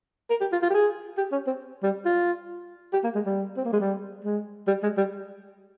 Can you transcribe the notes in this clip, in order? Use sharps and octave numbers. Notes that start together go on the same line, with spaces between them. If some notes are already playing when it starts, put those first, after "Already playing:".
A#4
G4
F4
F4
G4
G#4
G4
C#4
C4
G3
F4
G4
A#3
G#3
G3
C4
A#3
G#3
G3
G#3
G3
G#3
G3